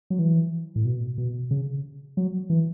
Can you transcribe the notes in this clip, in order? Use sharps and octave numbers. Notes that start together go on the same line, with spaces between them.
F#3
E3
A2
B2
B2
C#3
F#3
E3